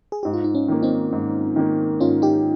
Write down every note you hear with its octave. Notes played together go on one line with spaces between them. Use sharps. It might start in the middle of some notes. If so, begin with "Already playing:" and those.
G#4
G#2 G4
F4
D#4
C#4
D#3 A#3
C4 D#4
G#2
D#3 A#3
G#2 C#4 F4
D#4 G4